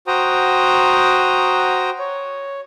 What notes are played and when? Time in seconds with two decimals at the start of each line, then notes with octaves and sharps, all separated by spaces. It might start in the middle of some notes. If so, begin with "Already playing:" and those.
0.07 F#4 C5 G5 A#5 D#6
1.99 C#5